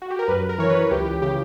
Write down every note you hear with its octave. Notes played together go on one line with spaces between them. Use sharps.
F#4
G4
A#4
F#2 B4
A#4
E3 C#5
B4
C#2 G4
G4
C#3 G4